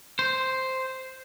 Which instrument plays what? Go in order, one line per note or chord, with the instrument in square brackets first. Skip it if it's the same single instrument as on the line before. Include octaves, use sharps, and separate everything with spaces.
[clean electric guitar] C5